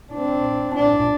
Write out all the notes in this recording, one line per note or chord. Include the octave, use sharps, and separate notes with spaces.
C4 D4
D4